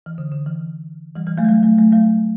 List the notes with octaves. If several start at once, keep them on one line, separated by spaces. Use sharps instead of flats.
E3
D3
D3
E3
E3 G3
E3 G3
F#3 A3
G3
F#3 A3
F#3 A3
F#3 A3
F#3 A3